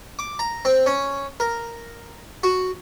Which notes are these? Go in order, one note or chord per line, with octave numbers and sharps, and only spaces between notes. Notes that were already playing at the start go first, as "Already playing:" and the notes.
D6
A#5
C4
C#4
A#4
F#4